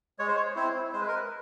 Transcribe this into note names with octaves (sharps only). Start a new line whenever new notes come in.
G#3 C#5
C5
C#5
C4 E4 C5
G#3 C5
B4
A#4
B4